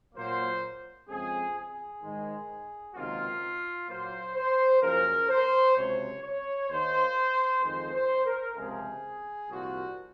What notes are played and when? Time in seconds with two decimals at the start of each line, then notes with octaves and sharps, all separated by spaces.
0.15 A#2 F#3 A#3 C5
1.08 F2 C#3 G#3 C4 G#4
1.55 G#4
2.02 G#2 D#3 G#3
2.95 C#2 C3 D#3 F#3 A#3 F4
3.88 A#2 F#3 A#3 C5
4.35 C5
4.81 F#2 C#3 F3 A#3 A#4
5.28 C5
5.75 C#2 C3 F#3 C#5
6.22 C#5
6.69 D#2 D#3 A#3 C5
7.62 F2 D#3 G#3 C5
7.93 C5
8.24 A#4
8.55 C#2 C3 F3 G#4
9.49 C2 A#2 F3 F#4